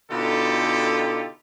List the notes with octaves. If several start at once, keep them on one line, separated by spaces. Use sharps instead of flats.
B2 D3 D#4 F4 G4 A4